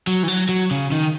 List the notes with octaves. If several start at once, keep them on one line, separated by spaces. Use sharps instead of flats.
F#3
E3
F#3
F#3
C#3
D#3